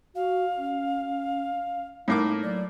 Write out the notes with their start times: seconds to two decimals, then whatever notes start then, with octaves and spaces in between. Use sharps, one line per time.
0.15 F#4 F5
0.58 C#4
2.08 A2 A#3 D#4 D6
2.43 F#3 D5